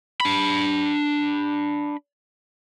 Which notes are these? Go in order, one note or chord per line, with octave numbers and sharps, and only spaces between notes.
D4 B5